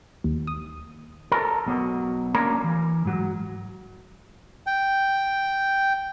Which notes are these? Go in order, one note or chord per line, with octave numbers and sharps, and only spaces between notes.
D#2
D#6
A4 A#4
B1 B2 F#3
A#3 C#4 D4 A#4 C#5 A#5
E3
G#2 F#3
G5